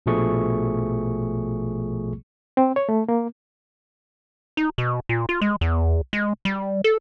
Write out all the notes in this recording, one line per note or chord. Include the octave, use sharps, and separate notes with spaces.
A#1 B2 F3 A3 G#4 C#6
C4
C#5
A3
A#3
D#4
B2
A#2
F4
G#3
E2
G#3
G3
A4